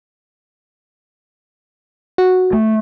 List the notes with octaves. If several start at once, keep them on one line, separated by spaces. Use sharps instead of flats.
F#4
A3